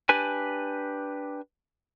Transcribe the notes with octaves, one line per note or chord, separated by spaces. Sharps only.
D4 G4 B4 G#5